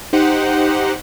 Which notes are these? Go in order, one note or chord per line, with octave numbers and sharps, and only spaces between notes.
D#4 G4 C5 F#5